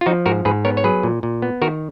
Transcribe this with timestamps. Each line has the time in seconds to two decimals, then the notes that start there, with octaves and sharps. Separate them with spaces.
0.01 F4
0.06 F3 D#4 F#4
0.26 G#2 F#4 A#4
0.45 G#2 G#4 B4
0.65 B3 A#4 C#5
0.77 C#5
0.84 F#3 G#4 B4
1.03 A#2
1.23 A#2
1.42 B3
1.62 D#3 F#4 A#4